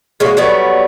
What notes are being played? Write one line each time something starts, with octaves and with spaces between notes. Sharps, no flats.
G#3 A#3 C#4 F#4
F#3 G3 A3 B3